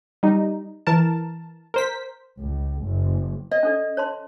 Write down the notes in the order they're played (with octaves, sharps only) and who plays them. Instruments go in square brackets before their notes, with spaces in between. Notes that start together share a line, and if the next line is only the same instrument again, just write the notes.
[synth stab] G3 D#4
E3 A#4 A5
A#4 C5 B6
[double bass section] C#2
F#1
[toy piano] D5 [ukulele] D#5
[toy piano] C#4 A4 D5
C#5 A5 C6